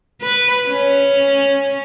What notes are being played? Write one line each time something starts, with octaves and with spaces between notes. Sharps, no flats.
B4
C#4